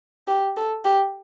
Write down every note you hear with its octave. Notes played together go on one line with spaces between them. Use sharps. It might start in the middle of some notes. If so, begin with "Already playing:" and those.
G4
A4
G4